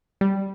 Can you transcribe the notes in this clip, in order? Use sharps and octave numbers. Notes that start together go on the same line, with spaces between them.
G3